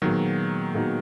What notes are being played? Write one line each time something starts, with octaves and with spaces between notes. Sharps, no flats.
A#2 D#3 F#3 G#3 B3 D#4 F#4
A#2 G#3 B3 D#4 F#4